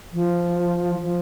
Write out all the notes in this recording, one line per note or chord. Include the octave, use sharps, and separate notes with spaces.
F3
F3